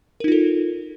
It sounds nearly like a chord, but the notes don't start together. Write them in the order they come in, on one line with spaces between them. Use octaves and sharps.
A#4 D#4 F4 A4